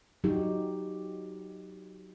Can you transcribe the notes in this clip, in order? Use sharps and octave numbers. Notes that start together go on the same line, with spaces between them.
F#3 D#4 F#4 G4